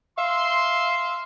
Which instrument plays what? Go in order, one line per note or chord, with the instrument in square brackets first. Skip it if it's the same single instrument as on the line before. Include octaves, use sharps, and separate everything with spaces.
[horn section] E5 F5 C6